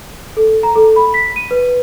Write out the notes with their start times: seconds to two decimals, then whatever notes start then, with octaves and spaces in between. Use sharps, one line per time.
0.37 A4
0.63 A#5
0.76 A4
0.96 B5
1.14 B6
1.36 D#7
1.51 B4